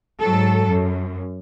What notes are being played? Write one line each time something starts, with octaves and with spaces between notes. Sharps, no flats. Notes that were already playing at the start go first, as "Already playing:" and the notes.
G#2 F#3 A4
F#2